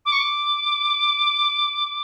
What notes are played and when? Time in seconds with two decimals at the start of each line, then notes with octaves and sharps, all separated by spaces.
0.06 D6
0.12 C#6
0.19 D6